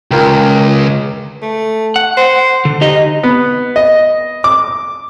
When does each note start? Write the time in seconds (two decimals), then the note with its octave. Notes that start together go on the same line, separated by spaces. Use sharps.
0.11 C#2 F4 A#4 G5
1.43 A3
1.96 F#5
2.18 C5
2.65 D3
2.81 D#4 G4 D#5
3.23 B3
3.76 D#5
4.44 D6